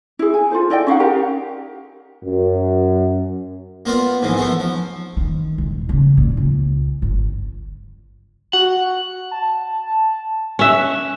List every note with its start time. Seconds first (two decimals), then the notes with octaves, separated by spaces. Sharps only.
0.19 E4 G#4
0.34 G#5
0.51 F4 A4 C5
0.70 E4 D5 D#5 G5
0.87 C#4 D#4 F5 F#5
1.00 G4 A#4 A#5
2.22 F#2
3.86 A#3 B3 F4 D5
4.22 G#2 E3 F3
4.37 F3 A3 B3
4.60 F3
5.17 D#3
5.58 E1
5.89 C#3
6.17 A#2
6.37 C#2
7.02 G1
8.53 F#4 F#5
9.31 A5
10.59 C#4 E5 F#6